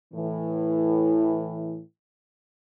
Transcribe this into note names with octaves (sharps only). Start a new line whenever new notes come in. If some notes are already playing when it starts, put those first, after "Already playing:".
A2 E3